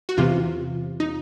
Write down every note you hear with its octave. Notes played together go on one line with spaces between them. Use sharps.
F#4
E2 C3 E3 F4
D#4